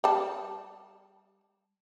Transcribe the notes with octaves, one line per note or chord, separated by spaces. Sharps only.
G3 A5